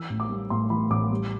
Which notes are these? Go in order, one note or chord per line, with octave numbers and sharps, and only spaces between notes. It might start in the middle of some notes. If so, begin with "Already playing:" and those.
Already playing: E3 E6
A1
D6
G3
A2 C6
E3 B5
A1 D6
G3